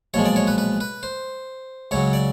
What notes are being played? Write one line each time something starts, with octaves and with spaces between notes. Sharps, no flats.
B1 A#2 F3 G#3 C#5
D5
C#5
B4
B4
B4
C5
C#2 C#3 F#3 C#5
D5